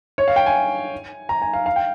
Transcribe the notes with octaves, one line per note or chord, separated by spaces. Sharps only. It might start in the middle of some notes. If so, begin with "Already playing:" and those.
C#5
F5
G5
G#5
A#5
G#5
F5
F5
G5